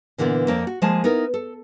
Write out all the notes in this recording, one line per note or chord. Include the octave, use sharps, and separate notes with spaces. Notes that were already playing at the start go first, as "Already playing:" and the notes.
A#2 D3 E3 A#3 B3
F2 A#3 C5 D5
F#4
F3 G#3 A#3 G#5 A5
B3 D#4 E4 A#4
A4